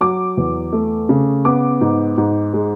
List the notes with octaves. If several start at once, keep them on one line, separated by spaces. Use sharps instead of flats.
F#3 D6
E2
A3
C#3
B3 D6
G#2
G#2
G#3